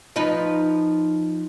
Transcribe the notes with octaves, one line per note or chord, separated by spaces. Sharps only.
F3 D#4 B4